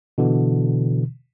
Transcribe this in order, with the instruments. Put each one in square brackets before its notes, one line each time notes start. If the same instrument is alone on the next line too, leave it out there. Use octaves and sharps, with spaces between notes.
[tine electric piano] B2 D3 E3